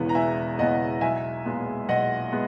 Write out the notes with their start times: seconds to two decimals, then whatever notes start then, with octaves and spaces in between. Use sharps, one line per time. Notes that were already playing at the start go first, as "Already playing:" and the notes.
Already playing: E1 E2 C#3 E3 B3
0.09 A#5
0.15 E1 E5 G#5
0.58 E2 C#3 E3 B3 D#5 F#5
1.01 B1 E5 G#5
1.45 A#2 G#3 B3
1.89 B1 D#5 F#5
2.32 G#3 B3